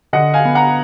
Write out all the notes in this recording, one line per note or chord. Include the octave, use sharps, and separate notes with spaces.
D3 D#5 F#5
F5 G#5
B3
F#5 A#5